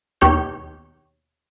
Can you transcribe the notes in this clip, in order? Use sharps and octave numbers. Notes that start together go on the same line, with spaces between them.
D#2 B2 G4 C#5 G6